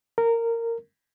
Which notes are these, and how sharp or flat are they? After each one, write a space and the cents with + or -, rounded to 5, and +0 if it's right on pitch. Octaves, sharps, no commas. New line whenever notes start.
A#4 -15